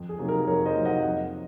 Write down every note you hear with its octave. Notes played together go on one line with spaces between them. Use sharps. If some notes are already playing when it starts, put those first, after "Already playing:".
Already playing: F2
G#4
C3 F#3 A#3 D#4
A#4
F2 A#4 C#5
C5 D#5
C3 F#3 A#3 D#4
D#5 F#5
F2